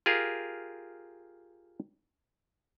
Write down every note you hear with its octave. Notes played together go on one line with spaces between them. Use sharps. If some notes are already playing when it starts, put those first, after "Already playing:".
F4 G4 G#4 A#4